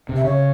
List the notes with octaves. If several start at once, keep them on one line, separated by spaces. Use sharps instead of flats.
C3
E5
C#3 C#5